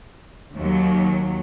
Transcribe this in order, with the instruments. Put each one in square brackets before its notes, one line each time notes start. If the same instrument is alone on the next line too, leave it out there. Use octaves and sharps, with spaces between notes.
[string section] D#2 F#3